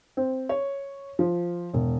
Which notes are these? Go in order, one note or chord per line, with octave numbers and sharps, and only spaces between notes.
C4
C#5
F3
E1